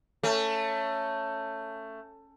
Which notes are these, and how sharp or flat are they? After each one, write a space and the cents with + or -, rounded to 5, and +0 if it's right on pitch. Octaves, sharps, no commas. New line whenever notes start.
A3 +15 C#4 +0